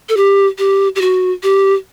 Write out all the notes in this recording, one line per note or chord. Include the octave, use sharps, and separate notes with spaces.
A4
G4
G4
G4
F#4
G4